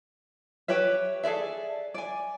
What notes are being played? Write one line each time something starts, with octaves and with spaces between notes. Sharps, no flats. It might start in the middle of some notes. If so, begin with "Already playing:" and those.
G4 B4 C#5 E5
G#4 A4 D5 E5
D5 G#5